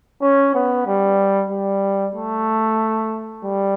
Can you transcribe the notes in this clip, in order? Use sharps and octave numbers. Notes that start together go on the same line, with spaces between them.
C#4
B3
G3
G3
A3
G3